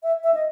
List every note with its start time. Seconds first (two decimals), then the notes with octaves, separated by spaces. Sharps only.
0.03 E5
0.24 E5
0.34 D#5